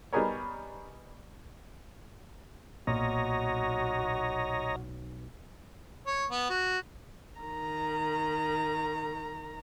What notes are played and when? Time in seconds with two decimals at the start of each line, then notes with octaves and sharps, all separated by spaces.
0.13 G3 B3 D#4 G#4 A#4 C#5
2.87 B1 A#2 F#4 C#5 D#5 A#5
6.07 C#5
6.30 B3
6.50 F#4
7.40 D#3 A#5